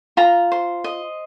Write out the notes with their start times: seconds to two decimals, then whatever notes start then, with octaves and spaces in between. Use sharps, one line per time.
0.17 F4 A#5
0.52 C5
0.84 D#5